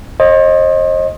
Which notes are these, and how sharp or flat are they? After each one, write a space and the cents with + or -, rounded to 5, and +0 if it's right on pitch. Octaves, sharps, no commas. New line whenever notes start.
C5 +40 D#5 +0